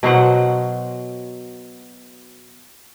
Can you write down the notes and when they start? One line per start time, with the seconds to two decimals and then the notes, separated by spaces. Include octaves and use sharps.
0.03 B2 F#3 C5 F#5